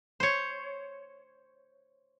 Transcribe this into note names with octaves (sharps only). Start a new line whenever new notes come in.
C5 C#5